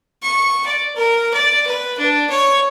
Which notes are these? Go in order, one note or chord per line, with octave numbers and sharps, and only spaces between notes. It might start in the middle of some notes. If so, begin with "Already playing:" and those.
C#6
D5
A#4
D5
B4
D4
C#5